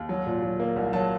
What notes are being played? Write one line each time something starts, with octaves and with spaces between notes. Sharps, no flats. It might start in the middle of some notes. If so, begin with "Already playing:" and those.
Already playing: D#2
F#3
A#2
F#3
A#3
C2
F#3 A5